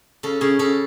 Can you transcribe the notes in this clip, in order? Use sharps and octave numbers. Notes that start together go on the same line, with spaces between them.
C#3 A4
C#3 G#4
C#3 A4